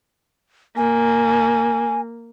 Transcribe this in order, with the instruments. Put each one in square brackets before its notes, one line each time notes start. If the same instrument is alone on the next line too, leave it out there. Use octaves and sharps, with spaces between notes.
[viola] A#3 [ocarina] G#5